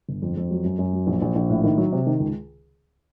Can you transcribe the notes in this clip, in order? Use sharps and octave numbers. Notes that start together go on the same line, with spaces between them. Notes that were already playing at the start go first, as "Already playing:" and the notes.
G1
F2
F2
F#3
F#2
F#2
F#3
A#1
A#1
A#1
A2
D#3
F#3
C3
D#3
C#2